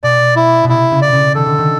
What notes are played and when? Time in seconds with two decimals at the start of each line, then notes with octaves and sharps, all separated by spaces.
0.03 B2 D5
0.36 E4
0.64 B2
0.69 C3 E4
0.91 C#3
1.02 D5
1.13 C#3
1.35 D#3 A4
1.46 D3
1.58 D#3